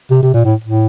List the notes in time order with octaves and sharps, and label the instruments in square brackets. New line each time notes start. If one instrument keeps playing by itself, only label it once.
[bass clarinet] C3
C3
A#2
A2
A2